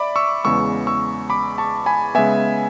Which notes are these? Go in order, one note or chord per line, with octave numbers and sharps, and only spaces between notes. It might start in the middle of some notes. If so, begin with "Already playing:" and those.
Already playing: D5 E5 B5 D6
C#6 E6
E2 C#3 G#3 B3 C#6 E6
C#6 E6
B5 D6
A5 C#6
G#5 B5
C#3 G#3 B3 E5 G#5